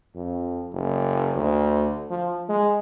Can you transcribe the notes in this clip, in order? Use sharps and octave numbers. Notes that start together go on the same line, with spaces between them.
F2
F#1
D2
F3
G#3